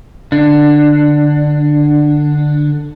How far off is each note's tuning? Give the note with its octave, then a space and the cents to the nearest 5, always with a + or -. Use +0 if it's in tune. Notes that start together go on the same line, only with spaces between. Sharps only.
D3 +15 D4 +10